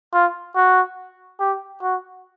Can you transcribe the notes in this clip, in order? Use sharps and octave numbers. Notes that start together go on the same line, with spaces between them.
F4
F#4
G4
F#4